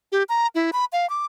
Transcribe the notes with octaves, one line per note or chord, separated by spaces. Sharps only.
G4
A#5
E4
B5
F5
D6